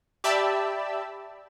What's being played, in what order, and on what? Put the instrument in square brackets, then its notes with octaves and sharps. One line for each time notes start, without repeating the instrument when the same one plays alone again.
[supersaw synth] G4 D5 E5 A5 B5 E6